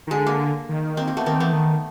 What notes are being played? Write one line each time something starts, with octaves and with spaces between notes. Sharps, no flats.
D#3
D3 G#3
A#3
D#3
A#3 C4
A#3
A3 B3
D#3 A#3 C4
E3 A3 B3
D#3